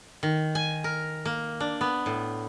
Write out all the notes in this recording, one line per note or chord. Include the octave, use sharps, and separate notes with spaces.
D#3
G#5
A#4
A#3
D4
B3
A2